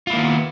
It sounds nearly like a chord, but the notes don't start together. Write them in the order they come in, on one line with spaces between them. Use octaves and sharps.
F4 E4 A#3 D#3 B3